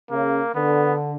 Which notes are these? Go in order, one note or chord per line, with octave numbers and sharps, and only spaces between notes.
C#3 A#3
D3 B3